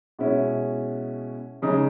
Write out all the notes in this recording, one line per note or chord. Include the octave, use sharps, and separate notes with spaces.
B2 G#3 C#4 E4
C#3 G#3 D#4